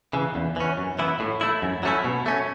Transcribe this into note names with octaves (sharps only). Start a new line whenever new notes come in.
C#3 E3
E2
E3 C#4
F#2
E3 B3 E4
A2
A3 E4
F#2
F#3 A3 C#4 E4
B2
A3 C#4